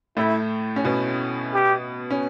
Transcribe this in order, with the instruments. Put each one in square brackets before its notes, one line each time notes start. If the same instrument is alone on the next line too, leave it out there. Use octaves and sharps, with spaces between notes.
[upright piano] A2 A3 [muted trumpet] E4
[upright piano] C#4
B2 B3
[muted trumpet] G4
[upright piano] C#4